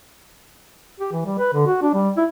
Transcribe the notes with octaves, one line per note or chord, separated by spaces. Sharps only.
G4
E3
G3
B4
D3
F#4
D4
G3
E4